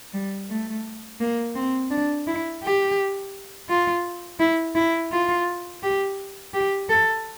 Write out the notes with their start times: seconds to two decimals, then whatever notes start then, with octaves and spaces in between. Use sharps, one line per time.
0.13 G3
0.49 A3
1.20 A#3
1.55 C4
1.90 D4
2.27 E4
2.63 G4
3.69 F4
4.39 E4
4.75 E4
5.12 F4
5.83 G4
6.54 G4
6.89 A4